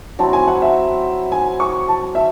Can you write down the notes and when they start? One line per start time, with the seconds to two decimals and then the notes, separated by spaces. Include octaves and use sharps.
0.19 F#3 C4 E4 A5
0.33 G#5
0.47 F#5
0.62 E5
1.32 G#5
1.60 C#6
1.88 A5
2.15 E5